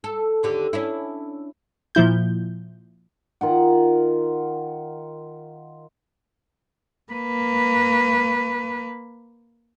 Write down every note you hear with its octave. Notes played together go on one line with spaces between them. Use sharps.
A4
D#2 D3 G4
C#4 D4 E4
A#2 F3 E4 G6
D#3 F4 F#5
A#3 B4